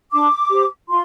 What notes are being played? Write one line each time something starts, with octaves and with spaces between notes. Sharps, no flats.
D4 D6
G4 C5
F4 C6